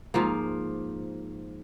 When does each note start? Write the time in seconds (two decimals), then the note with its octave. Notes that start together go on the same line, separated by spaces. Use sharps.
0.14 G#2 F3 A#3